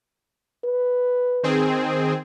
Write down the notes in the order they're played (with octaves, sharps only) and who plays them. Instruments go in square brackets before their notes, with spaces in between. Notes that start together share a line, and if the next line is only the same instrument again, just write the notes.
[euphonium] B4
[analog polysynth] D#3 C4 G#4